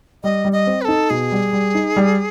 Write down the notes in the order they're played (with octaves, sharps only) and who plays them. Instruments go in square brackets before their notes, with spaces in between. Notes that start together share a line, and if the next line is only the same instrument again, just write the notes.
[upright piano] G3 [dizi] D#5
[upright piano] G3
[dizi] D#5
[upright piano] C4
[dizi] B4
[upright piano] D#4 [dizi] A4
[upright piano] B2 [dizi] G#4
[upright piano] G3
G3
D#4
G3